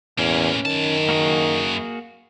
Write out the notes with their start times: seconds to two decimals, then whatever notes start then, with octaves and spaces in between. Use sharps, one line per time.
0.19 E2 A2 A#3 C#4
0.66 F#2 D#3 A5
1.09 A#3 F#4 G#4